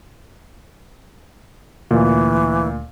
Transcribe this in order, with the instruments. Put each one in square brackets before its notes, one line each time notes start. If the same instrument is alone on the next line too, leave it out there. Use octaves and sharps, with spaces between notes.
[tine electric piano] D2 [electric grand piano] A#2 [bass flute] E3